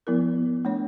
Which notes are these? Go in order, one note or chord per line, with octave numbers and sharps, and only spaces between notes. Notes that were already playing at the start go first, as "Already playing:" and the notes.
F3 B3 E4 A#4
A3 D4 C#5